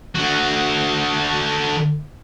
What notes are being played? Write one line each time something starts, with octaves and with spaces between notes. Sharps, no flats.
D3 F#4